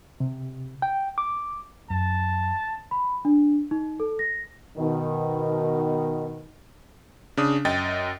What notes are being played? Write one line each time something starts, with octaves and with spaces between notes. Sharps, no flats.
C3
G5
D6
F#2 A5
B5
D4
D#4
A4
A#6
B2 D#3
C#3 D4 D#6
F#2 D#5 G5 A6